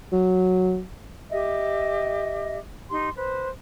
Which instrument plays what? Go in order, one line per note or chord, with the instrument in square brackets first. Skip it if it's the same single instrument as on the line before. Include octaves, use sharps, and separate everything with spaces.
[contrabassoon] F#3
[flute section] G4 D#5 E5
D#4 G4 C6
B4 C5